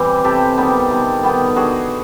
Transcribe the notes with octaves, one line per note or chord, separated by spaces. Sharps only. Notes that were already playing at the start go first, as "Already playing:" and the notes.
Already playing: E3 G3 C4
C3 G4 A4
D#3 G3 B3
C3
D#3 G3 B3
D3 F#4 G#4